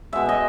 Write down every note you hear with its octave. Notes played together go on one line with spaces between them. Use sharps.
B2 G#3 E5
D#5